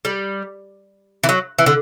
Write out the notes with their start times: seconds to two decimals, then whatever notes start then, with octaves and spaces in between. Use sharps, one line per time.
0.05 G3
1.24 E3
1.29 F#3
1.59 E3
1.66 D3